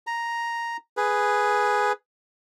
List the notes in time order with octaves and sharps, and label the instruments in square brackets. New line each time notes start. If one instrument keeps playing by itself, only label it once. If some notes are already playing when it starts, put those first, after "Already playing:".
[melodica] A#5
G#4 B4